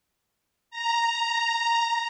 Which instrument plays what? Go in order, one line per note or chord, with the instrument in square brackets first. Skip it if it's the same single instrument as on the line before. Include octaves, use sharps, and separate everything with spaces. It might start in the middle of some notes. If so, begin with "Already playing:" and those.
[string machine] A#5